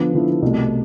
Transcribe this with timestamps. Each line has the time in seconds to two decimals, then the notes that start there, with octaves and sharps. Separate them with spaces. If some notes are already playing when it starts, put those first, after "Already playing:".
Already playing: D3 F3 B3
0.13 D3 F3 B3 E4
0.42 C2 B2 A3